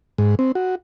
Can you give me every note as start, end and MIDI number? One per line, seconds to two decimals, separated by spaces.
0.18 0.35 44
0.39 0.52 60
0.55 0.75 66